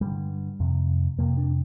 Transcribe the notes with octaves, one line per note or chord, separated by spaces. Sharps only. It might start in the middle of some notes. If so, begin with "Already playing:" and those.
G2 D3 G3
F2 C3
F2 C3 A#3
D4